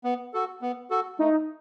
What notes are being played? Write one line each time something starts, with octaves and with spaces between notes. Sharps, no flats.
B3
F#4 A4
B3
F#4 A4
A3 D#4